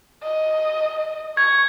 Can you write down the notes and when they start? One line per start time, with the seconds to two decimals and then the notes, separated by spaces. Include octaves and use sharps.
0.23 D#5
1.37 C#6 G#6